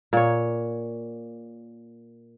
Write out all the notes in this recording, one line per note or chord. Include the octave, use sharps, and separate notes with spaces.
A#2 C#5